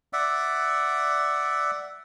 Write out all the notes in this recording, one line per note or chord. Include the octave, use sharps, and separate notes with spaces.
D5 E5 F#5